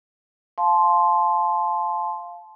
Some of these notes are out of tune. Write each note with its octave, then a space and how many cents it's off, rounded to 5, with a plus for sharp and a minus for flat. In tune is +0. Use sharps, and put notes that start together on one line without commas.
F5 +0 A5 -25 C6 +0